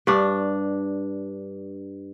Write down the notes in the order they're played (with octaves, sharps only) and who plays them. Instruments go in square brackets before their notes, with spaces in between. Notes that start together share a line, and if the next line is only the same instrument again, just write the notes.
[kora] G2 D4